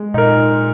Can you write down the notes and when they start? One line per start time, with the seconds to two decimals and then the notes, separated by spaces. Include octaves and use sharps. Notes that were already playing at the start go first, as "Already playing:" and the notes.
Already playing: G#3
0.14 A#2 D#4 A#4